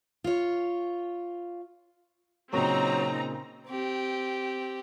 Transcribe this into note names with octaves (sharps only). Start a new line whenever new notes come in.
F4 C#5
A#2 C#3 F#3 C4 D#4 A#5
C4 G4